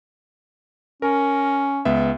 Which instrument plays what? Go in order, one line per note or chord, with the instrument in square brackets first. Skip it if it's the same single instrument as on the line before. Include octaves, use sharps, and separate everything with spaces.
[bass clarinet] C#4 [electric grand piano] A#4
[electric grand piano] C#2 B3 E5